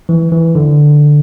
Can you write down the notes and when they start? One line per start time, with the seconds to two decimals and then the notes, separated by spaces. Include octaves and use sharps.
0.09 E3
0.32 E3
0.55 D3